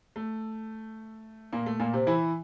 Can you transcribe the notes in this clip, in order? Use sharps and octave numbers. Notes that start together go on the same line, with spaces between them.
A3
A#2 A#3
A3
A#2 A#3
C3 C4
E3 E4